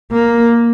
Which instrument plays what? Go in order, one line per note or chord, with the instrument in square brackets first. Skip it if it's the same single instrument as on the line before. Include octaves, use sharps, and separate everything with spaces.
[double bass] A#3